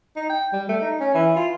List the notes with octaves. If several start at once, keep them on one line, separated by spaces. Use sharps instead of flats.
D#4
G5
G3
A3
D#4
C#4
E3
F4